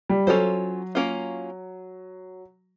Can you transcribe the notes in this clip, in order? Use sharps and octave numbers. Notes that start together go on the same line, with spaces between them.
G3
F#3 C#4 F4 A4 C5
A#3 C#4 F4